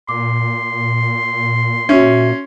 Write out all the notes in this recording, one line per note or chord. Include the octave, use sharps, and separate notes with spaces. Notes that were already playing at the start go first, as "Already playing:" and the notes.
A#2 C6 D6
C#4 F#4 E5